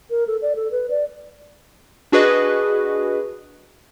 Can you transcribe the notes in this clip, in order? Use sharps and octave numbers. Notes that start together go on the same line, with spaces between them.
A#4
A4
D5
A4
B4
D5
D4 F#4 G#4 B4 D#5